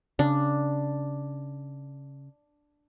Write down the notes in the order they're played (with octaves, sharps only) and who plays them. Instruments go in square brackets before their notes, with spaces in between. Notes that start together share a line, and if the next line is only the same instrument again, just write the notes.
[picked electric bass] C#3 [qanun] D4